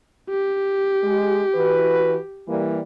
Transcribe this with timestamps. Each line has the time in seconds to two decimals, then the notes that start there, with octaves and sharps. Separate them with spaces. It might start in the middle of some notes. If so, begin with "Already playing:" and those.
0.30 G4
1.03 G#3
1.55 E3 F#4 B4
2.48 E3 G3 A#3